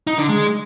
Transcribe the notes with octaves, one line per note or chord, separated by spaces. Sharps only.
D#4
D3
G#3